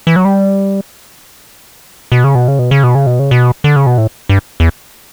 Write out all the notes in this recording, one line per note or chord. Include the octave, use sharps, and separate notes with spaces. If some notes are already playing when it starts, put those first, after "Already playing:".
E3
F#3
G3
B2
C#3
B2
C#3
B2
C#3
B2
C#3
B2
C#3
B2
D3
C#3
B2
A2
G2
E2